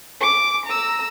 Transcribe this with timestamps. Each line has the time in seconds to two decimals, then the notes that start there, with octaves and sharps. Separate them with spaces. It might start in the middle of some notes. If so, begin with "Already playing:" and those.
0.20 D6
0.66 A#5 E6